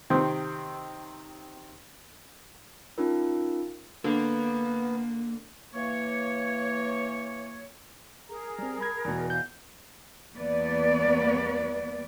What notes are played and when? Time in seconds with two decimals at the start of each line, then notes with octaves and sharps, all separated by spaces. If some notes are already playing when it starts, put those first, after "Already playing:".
0.10 C3 D#3 C4
2.98 C#4 D#4 F4 A#4
4.04 D3 A#3 B3
5.74 E3 A#3 C#5
8.28 G#4 A#4 A#5
8.59 G3 C4
8.80 B5 G#6
9.05 E2 B2
9.30 F5 A#5 G6
10.36 E2 G3 A#3 B3 B4 D5